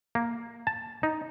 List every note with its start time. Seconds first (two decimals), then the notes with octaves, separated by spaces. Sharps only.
0.15 A#3
0.67 A5
1.03 D#4